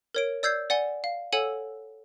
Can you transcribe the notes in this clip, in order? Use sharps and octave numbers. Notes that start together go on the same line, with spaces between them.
A#4 C#5 D7
D5 E6 G6 G#6 C7
D5 F#5 G#5 G7
F5
A4 C#5 F#5 G#5 E6 D#7